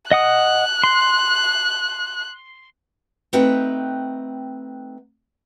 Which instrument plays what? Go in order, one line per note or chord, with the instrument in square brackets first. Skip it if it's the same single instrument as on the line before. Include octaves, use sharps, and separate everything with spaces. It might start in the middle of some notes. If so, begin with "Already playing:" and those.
[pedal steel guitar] D#5 F#5 D#6 [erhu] F#6
[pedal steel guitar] C6
[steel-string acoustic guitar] A3 C4 D#4 B4 F#5 G5